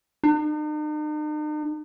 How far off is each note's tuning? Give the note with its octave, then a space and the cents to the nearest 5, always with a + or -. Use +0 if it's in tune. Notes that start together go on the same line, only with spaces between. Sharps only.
D#4 -45